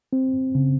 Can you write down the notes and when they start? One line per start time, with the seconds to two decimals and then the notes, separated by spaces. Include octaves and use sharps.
0.13 C4
0.55 C#3